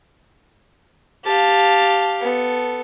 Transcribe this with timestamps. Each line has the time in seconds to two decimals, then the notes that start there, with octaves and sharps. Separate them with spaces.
1.26 G4 F5 A5
2.21 B3 A4